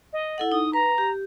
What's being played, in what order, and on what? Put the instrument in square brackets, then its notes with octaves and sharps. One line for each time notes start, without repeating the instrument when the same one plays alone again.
[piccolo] D#5
[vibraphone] E4 A4 F#5
[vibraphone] D#4 [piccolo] D#6
[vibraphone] B4 [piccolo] A#5
[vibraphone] G4